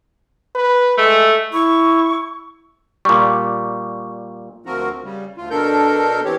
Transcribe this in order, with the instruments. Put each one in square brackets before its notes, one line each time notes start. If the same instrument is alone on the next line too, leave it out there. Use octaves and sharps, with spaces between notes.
[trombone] B4
[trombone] G#3 [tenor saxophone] A3
[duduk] E4 [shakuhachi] C#6
[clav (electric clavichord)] A#2 G3 [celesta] C#6
[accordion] D2 F3 C4 F#4 A#4
C#3 G3
D2 F4
B2 D4 A4 A#4 G6
E3 C4 G4 C#5